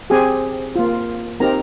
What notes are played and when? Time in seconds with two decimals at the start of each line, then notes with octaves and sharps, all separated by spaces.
0.10 C4 G4 G#4 G#5
0.76 A#3 F4
1.40 C4 D#4 G4 A#4 A#5